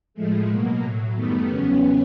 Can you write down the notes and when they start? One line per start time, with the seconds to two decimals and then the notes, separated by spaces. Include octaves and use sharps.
0.14 A2 F3 G#3 A3
0.48 B2 F#3 A#3
0.81 A2 F#3
1.14 F#2 D#3 G3 A3 B3
1.48 E2 C#3 F#3 B3 C#4